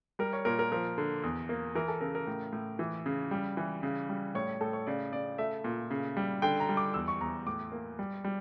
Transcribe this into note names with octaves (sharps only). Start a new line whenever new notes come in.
G3 A#4
C#5
A#2 A#4
A#4
F3 A#4
D3
E2
A#3
E3 A#4
A4
C#3 A#4
A#4
A2
A2
E3
C#3
G3
E3
C#3
G3
A2 C#5
A2 A4
C#5
C#3 D5
C#3 D5
A3 E5
A#2
C#3
G3
D3 G5
A#5
G3
D6
E2 E6
C#6
E2 A#5
A2 D6
A#3
G3
G3